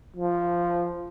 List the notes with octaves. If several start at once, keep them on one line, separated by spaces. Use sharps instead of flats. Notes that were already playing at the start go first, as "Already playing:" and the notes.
F3